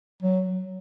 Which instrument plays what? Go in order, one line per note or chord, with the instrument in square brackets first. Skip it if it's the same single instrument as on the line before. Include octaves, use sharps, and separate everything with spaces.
[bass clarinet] F#3